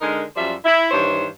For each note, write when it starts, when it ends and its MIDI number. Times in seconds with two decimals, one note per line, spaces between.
0.01 0.22 50
0.01 0.22 56
0.01 0.22 63
0.01 0.22 70
0.36 0.53 42
0.36 0.53 53
0.36 0.53 55
0.36 0.53 72
0.36 0.53 74
0.36 0.53 76
0.65 0.88 64
0.91 1.26 43
0.91 1.26 51
0.91 1.26 52
0.91 1.26 72
0.91 1.26 73